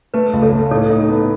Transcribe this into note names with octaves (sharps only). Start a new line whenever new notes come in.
A3 B4
C#2
A4 C#5
A3
A2 A4 C#5
D#4
A4
B3